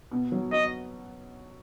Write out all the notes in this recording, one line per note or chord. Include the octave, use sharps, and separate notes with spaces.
B2
F#3
F#4 D#5